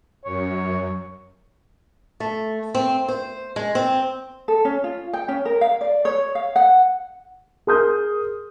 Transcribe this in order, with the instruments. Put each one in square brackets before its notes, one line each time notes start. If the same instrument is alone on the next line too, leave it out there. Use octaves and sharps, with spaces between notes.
[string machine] F#2 [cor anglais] C#5
[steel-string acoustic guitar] A3
C4
C5
G#3
C4
[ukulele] A4
C#4
F4
G5
C#4
A#4
F5
D5
C#5
F5
F#5
[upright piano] G#4 A#4 C6 D#6 F6 G6